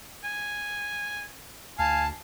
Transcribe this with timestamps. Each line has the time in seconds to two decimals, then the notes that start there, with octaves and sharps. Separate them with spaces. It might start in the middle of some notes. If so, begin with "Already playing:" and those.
0.24 G#5
1.79 D2 F5 G#5 A5